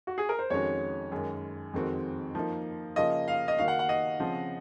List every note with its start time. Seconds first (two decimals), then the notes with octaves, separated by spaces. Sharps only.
0.07 F#4
0.18 G#4
0.29 A#4
0.39 C5
0.50 F2 D#3 G#3 C#4 F#4 C#5
1.12 F#2 D#3 G#3
1.73 F2 D#3 G#3 C4 F#4
2.35 F3 A#3 D#4
2.96 C#3 F3 A#3 F4 D#5
3.28 F5
3.48 D#5
3.58 D#3 A#3 D#4 F#4 F5
3.68 F#5
3.79 F#5
3.89 D#5
4.20 C#3 F3 C4